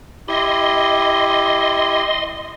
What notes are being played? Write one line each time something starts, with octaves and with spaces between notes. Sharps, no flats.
E4 G4 D#5 C6